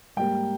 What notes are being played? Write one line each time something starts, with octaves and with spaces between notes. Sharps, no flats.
G#2 G3 A#3 G5